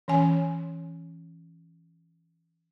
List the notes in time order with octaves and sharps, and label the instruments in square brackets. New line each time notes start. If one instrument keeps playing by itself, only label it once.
[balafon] E3 C#4 C#5 G#5